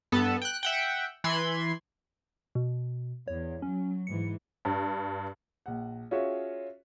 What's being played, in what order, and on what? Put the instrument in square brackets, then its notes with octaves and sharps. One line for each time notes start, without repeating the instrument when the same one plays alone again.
[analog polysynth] G2 B3 A4 A5
G5 F#6
E5 F#5 G5
E3 B5 C6 G#6
[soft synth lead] B2
[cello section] E2 [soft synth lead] C#5
[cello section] F#3 [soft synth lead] C#4
[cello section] G#2 E3 [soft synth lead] C#7
[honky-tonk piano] G2
[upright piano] A#1 F#5
C#4 F4 F#4 G#4 C#5 E5